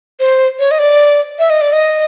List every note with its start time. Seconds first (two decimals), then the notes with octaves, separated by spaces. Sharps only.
0.20 C5
0.59 C#5
0.71 D#5
0.79 D5
1.39 E5
1.50 D#5
1.61 D5
1.73 D#5